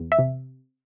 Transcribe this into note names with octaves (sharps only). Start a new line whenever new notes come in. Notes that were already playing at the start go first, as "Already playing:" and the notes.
Already playing: E2
E5
C3